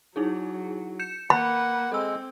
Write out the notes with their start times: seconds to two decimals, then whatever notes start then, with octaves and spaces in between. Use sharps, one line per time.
0.16 F#3 D#4 E4 G#4
0.99 G6 C#7 E7
1.30 A#3 B4 F#5 B5
1.92 G#3 C4 A4 E6